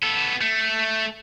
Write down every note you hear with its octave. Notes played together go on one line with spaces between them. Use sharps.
B3 A4
A3